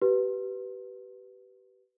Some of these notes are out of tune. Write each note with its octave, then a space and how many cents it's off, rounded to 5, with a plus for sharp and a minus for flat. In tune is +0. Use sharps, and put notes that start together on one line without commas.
G4 -25 B4 +0